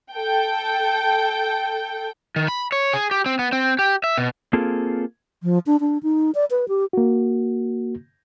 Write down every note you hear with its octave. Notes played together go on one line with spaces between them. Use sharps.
A4 G5
D#3
B5
C#5
G#4
G4
C4
B3
C4
G4
E5
B2
A#3 C4 F4 G#4 A4
F3
D4
D4
D#4
D5
B4
G4
A#3 F#4